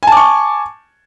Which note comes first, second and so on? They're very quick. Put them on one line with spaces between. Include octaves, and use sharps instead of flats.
G#5 A5 D6 C#6